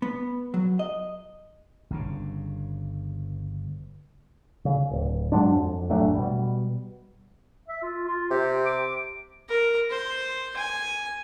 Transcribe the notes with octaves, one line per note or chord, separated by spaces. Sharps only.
B3
F#3
D#5
G1 G2 C#3
C#3
D1
G2 F#3 G#3 D4
F2
A1 F#3 A3 D4
B2 G3
E5
F4
F4
C3 G4
D6
A#4
C5
G#5